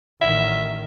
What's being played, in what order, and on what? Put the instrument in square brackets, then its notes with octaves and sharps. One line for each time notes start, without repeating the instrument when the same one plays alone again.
[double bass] A1 D#3 [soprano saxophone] E5